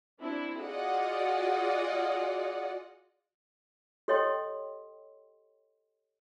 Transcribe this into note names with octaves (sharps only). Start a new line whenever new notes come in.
C4 D4 E4
F4 F#4 G#4 D5 D#5 F#5
G4 A4 C#5 D#5 G5 C6